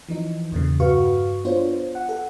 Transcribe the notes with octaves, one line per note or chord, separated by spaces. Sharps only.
E3 F3 D#4
E2 A#2 C#3
G2 F#4 B4 F5 C#6
B3 D4 F4 C5 C#5
F#5
A4 F#5